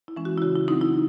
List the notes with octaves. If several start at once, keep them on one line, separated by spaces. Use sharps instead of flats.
E4
E3 G#3 C#4
F#4
E4
C#3 F#4
E4
F#3 C4 D#4
E4